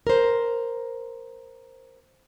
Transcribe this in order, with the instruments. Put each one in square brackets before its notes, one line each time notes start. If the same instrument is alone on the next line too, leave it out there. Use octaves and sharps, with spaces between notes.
[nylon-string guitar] A#4 C5